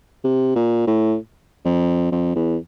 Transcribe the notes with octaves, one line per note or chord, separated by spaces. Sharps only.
C3
A#2
A2
F2
F2
E2